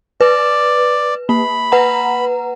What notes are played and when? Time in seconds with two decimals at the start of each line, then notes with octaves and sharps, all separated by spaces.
0.21 B4 D5
1.29 A#3 B5
1.72 B4 F#5 A#5